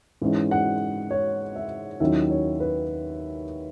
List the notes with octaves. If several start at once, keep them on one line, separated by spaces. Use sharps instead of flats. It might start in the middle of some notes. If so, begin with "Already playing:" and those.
G#2 E3 G#3 C#4
F#5
C#5
E5
D#2 D#3 F#3 C#4 E4 E5
C#5
B4